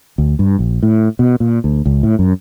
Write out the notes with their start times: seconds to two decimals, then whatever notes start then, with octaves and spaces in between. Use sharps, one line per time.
0.18 D2
0.39 G2
0.59 A#1
0.83 A2
1.19 B2
1.40 A#2
1.64 D2
1.86 C#2
2.03 A2
2.19 F#2